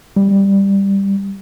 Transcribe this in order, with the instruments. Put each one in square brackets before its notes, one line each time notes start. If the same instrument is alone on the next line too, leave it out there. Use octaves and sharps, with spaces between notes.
[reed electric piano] G3